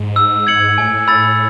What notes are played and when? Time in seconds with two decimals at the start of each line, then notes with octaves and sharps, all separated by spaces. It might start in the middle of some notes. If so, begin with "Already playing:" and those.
Already playing: G#2
0.16 E6
0.47 G#6 C#7 F#7
0.78 A2 G#5
1.07 B5 E6 A6